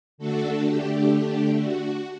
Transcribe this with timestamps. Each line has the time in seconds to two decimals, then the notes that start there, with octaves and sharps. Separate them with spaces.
0.18 D3 A3 D4 F#4 A4
0.65 G4
1.58 F#4